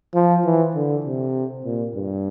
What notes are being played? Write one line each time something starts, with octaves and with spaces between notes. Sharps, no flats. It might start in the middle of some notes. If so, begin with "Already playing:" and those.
F3
E3
D3
C3
A#2
G2